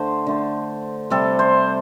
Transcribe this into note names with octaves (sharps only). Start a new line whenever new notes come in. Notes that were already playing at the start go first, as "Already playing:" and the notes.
Already playing: D3 A3 C5
D3 A3
C3 G3 A4
C5